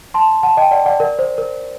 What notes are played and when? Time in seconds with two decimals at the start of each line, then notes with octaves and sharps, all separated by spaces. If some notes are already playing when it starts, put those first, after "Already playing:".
0.14 A5 C6
0.43 F#5 A5
0.57 D#5 G5
0.71 D5 F#5
0.86 D5 F#5
1.00 A#4 D5
1.19 C5
1.38 A#4